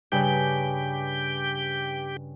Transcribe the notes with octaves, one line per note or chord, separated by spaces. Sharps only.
G2 C#3 G4 B4 G5